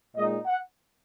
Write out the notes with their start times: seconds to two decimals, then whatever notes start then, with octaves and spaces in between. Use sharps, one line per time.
0.16 A#2 G#3 D#4 D#5
0.46 F#5